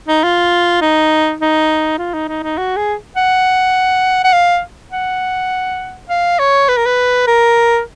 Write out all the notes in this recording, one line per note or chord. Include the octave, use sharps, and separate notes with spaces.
D#4
F4
D#4
D#4
F4
D#4
D#4
D#4
F#4
G#4
F#5
F#5
F5
F#5
F5
C#5
B4
A#4
B4
A#4